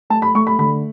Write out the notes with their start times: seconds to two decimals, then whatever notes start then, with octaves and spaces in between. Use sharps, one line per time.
0.10 A3 A5
0.22 B5
0.35 A3 C#6
0.47 B5
0.58 D3 B5